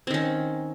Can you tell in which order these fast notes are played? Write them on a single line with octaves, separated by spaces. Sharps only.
C4 D#3 C#4